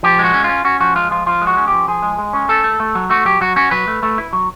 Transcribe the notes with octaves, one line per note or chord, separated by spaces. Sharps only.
F3 G4
G#3
F#4
C#4
C#4 F4
C#4 F#4
F3 F#4
G#3 F4
F3 F4
F3 F4
G#3
F#4
C#4
F3 G4
F3 G#4
G#3
G#3
C#4
A3 A4
A3
A3
F#3
A3 F#4
F#3 G4
F#3 F#4
C#4 F#4
F#3 B4
A3
A3
E4
F#3